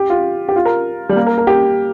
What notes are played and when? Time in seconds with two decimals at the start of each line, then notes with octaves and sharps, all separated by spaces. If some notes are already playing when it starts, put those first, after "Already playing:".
Already playing: G4
0.10 F4
0.49 G4
0.56 F4
0.65 A#4
1.09 G3
1.16 A#3
1.27 A#4
1.38 A#4
1.47 G4